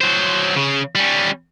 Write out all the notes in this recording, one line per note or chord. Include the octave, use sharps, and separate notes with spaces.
F#3 C5
C#3
G3 C#4